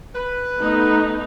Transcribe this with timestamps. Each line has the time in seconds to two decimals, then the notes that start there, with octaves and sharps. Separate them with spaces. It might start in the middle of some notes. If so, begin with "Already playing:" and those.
0.15 B4
0.60 A3 B3 D#4